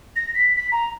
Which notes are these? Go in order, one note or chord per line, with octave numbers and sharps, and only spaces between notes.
A#6
B6
B6
A#5